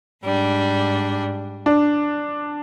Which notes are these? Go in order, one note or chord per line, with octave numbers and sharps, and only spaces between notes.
G#2 G3 D4
D4